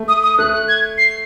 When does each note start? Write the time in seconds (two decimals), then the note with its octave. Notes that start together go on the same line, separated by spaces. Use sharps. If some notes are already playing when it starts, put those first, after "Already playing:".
Already playing: A3
0.08 D#6
0.23 D#6
0.38 A3 F#6
0.53 F#6
0.68 G#6
0.98 C7